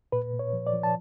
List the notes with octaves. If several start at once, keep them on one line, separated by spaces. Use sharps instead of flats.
A#2 B4
A#2
C#5
F3
D5
F3
A5